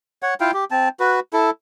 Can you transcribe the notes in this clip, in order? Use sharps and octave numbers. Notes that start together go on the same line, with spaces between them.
C#5 F#5
E4 F4 F5 G5
G4
C4 A5
F#4 B4
E4 A4